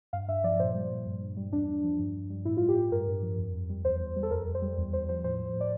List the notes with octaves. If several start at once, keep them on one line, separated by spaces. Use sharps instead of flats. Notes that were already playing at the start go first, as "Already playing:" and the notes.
G2 F5
G2 E5
F3 D5
A#2 C5
G3
A#2
G2
G2
G3
E2 D4
E2
F3
G2
G2
G3
A2 E4
F4
G3
G4
A2
G2 A#4
G2
F3
F2
F2
G3
E2 C5
E2
G3
A4
F2 A#4
F2
C5
G3
E2
E2 C5
F3 C5
A2 C5
F3
A2
D5